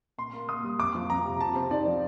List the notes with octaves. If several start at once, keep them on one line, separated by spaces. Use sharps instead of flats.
A#2 C6
A#3
A#2 D#6
G3
F2 D6
F3
F2 A#5
C3
C3 A5
C4
D#4 D5
F3